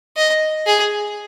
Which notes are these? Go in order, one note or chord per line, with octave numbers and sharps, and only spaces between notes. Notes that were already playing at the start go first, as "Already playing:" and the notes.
D#5
G#4